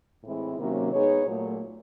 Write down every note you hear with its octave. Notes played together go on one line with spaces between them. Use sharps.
A2 E3 G#3 C4 E4
C3 D#3 F#3 A#3 C#4
G#3 B3 D#4 G#4 C#5
A#2 F#3 A3